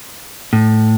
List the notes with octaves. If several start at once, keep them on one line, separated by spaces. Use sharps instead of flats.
A2